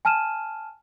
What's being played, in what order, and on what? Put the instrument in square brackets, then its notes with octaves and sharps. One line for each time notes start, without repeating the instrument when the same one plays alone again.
[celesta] G#5 A5 F6 D#7 E7